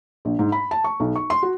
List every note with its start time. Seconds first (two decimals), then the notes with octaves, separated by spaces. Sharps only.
0.25 A#1
0.39 G#2
0.52 B5
0.71 A5
0.84 C#6
1.00 B1
1.16 C#6
1.30 C6
1.43 F#4